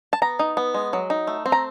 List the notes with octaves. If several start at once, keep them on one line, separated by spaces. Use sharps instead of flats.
A5
B3 A#5
D#4
B3
G#3
F#3
D#4
A3
C4
A#5